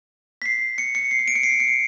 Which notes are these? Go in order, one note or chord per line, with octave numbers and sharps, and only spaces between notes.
B6
C7
C#7
C#7
C7
C#7
D7
C#7
C7
D7
C#7
C7